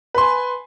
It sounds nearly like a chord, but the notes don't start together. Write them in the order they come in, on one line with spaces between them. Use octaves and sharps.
B4 C6 G#5